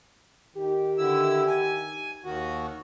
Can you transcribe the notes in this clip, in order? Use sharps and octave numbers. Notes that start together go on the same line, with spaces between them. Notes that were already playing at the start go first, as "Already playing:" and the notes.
D#3 G4
D3 E4 E6
G#5
D#2 D#3 F#4